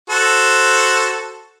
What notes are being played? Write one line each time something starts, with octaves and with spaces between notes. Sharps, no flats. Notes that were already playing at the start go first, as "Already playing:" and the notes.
F#4 A4 C5